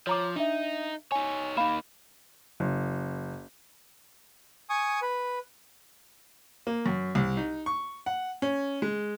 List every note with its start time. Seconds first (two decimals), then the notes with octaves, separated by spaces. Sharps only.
0.07 F3 C#5 A#5 D6
0.36 D4 D#4 E5
1.12 D#4 C#5 G#5
1.57 A#3 D#4 F5 B5 E7
2.60 F#1
4.70 G#5 C#6 D#6
5.02 B4
6.67 A#3
6.86 F#2
7.15 C2
7.37 D#4
7.66 C#6
8.06 F#5
8.42 C#4
8.82 G#3